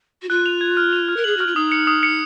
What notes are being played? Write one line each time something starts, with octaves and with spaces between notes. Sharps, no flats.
F#4
F4 F#6
F7
G#6
F6
F7
F6
A#4
G#4 F#7
F#4 F6
F4
D#4 D#6
C#7
D#6
C#7